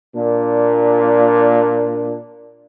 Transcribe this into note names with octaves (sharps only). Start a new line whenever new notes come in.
A#2 D4